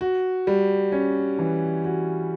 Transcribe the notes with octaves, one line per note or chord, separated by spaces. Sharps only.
F#4
G3
C#4
E3
F#4